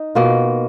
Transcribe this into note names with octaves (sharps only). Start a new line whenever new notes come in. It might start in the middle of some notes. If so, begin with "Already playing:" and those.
Already playing: D#4
B2 A#3 F4